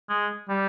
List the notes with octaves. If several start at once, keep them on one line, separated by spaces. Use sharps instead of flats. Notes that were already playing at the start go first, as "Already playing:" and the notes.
G#3
G3